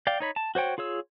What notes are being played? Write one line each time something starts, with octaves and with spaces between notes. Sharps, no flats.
D5 F5 G5
D#4 C#5 B5
A5
F#4 C5 C#5 G5
F4 G#4 C#5 E6